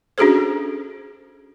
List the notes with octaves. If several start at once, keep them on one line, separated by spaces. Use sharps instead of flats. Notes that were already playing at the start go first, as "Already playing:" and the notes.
C#4 D4 F#4 G#4 A4 C5